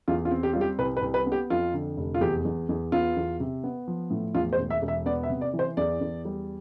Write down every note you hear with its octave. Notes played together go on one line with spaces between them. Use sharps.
E2 F4
F4
C4
G4
G3 F4
G4
C2 B4
B4
C2
B4
B3
G4
F2 F4
D3
F1
F4
E2 G4
E2
E2
B3 F4
E2
C3
B3
F3
A2
E2 F4
C5
E1
E5
E1
E5
B3 D5
E5
C3
D5
E3
C5
E2 D5
E2
G3